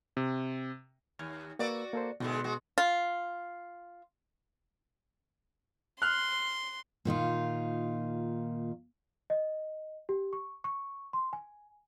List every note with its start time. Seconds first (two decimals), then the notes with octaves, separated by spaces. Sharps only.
0.17 C3
1.19 D#2 F6 G#6
1.59 A#3 F#4 B4 D5 E6
1.93 A#3 A4 C5
2.20 G#2 B2 D3 G#3
2.44 G#3 F#4
2.78 F4
6.02 C6 F6 F#6
7.05 A#2 D#3 D#4 F4
9.30 D#5
10.09 G4
10.33 C#6
10.64 C#6
11.13 C6
11.33 G#5